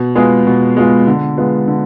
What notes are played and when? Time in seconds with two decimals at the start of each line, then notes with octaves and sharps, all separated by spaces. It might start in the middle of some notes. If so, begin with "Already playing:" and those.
Already playing: B2
0.15 G#3 B3 F4 G#4
0.47 B2
0.77 G#3 B3 F4 G#4
1.07 D3
1.37 G#3 B3 F4
1.68 D3